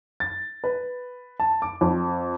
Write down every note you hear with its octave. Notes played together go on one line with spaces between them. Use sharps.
A6
B4
A5
D6
F2